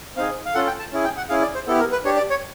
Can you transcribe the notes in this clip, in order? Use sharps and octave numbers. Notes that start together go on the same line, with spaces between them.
C4 D#4 G#4 F5
F5
C#4 F4 A4 F#5
G5
A5
C#4 E4 G#4
G5
F#5
C#4 E4 G#4 F5
D5
C5
B3 E4 G4 A4
A#4
B4
D4 G4 C#5
D5
C#5